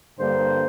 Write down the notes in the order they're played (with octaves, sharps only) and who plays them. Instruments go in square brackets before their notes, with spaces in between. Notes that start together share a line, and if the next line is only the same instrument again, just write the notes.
[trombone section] G2 D3 G3 A#3 C5